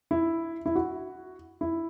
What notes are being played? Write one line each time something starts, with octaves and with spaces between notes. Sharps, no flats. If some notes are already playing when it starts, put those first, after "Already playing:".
E4
E4
F#4
E4